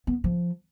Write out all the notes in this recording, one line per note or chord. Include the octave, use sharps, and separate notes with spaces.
B3
F3